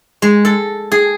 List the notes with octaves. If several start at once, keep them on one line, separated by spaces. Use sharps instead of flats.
G#3
A4
G#4